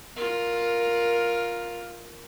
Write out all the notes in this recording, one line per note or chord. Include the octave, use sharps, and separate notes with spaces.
F4 A#4